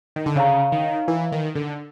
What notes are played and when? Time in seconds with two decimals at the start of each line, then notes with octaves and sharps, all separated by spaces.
0.16 D#3
0.26 D3
0.36 C#3 C#5 F5 A#5
0.72 D#3
1.08 E3
1.32 D#3
1.55 D3